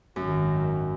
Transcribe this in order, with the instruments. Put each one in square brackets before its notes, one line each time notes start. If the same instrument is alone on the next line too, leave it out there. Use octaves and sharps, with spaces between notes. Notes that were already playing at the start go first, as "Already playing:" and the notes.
[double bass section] G#1 D#3 F#3 [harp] F#2